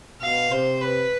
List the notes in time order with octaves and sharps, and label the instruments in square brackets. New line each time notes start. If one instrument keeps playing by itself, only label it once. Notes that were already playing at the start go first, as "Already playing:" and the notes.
[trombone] B2 [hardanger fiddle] F5
[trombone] C3 [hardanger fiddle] C5
[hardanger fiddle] B4